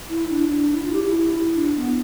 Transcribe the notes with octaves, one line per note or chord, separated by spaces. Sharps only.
E4
D4
D4
E4
F4
G4
E4
D4
B3